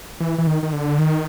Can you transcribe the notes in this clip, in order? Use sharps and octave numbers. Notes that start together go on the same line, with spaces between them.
E3
E3
D#3
D#3
D3
D#3